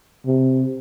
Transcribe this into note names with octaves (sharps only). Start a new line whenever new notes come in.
C3